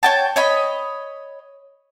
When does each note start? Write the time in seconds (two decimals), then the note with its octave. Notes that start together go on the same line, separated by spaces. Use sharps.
0.03 C#5 G5 A5
0.36 C#5 D#5 B5